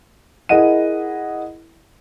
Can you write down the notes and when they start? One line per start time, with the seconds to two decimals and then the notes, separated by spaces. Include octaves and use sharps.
0.49 E4 G#4 A#4 D#5 F#5 D#7